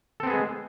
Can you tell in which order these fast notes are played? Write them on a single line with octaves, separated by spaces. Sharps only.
A4 C4 B3 G#4 G#3